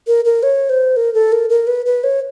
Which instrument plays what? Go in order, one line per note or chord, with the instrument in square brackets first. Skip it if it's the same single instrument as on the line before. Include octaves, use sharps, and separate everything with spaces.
[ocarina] A#4
A#4
C#5
C5
A#4
A4
A#4
A#4
B4
B4
C#5